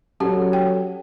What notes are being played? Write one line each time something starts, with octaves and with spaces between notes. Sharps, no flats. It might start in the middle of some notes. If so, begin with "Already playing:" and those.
F#3 C#4 G4 A4 C#5
G5